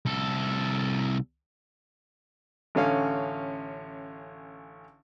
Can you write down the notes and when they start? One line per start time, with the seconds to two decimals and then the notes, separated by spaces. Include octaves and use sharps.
0.05 C2 A4
2.75 A1 D3 C#4 F5